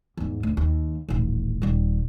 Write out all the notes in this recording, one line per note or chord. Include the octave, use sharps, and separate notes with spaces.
E2 G#2
D2
D#2
D#1 A1
D#1 G3